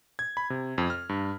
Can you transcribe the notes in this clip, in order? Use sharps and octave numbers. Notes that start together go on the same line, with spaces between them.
G#6
B5
C3
F2
F6
G2